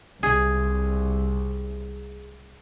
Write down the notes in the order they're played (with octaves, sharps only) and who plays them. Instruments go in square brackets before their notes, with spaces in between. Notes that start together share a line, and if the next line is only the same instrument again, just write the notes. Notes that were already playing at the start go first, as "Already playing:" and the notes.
[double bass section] C2 [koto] G#4